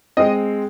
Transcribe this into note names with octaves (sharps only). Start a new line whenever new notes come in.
G#3 C4 D#5